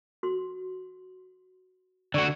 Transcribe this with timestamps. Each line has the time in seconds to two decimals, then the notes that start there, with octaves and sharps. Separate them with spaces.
0.23 F#4 C6
2.14 D3 F#4 D5 C#6